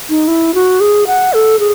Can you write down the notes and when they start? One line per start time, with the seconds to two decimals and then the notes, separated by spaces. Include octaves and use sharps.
0.10 D#4
0.28 E4
0.54 F#4
0.80 G#4
1.07 F#5
1.33 A4
1.59 G#4